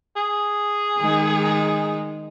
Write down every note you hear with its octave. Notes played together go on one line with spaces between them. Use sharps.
G#4
D#3 G#3 D#4